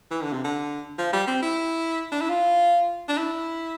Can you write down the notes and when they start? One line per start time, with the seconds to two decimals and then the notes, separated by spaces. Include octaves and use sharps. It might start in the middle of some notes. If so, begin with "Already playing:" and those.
0.11 E3
0.22 D3
0.33 C3
0.44 D3
0.98 F3
1.13 G3
1.27 C4
1.42 E4
2.12 D4
2.21 E4
2.30 F4
3.09 D4
3.18 E4